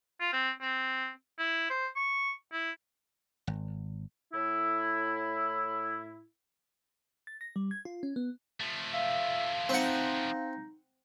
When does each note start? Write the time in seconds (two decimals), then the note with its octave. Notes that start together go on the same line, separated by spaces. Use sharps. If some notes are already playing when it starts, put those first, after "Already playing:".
0.20 F4
0.33 C4
0.62 C4
1.39 E4
1.70 C5
1.96 C#6
2.52 E4
3.47 G#1
4.33 A2 E4
7.27 A6
7.41 A#6
7.56 G3
7.71 G#6
7.85 F4
8.03 C#4
8.16 B3
8.60 F3 A3
8.93 E5 F5
9.69 C4 D#4 F#5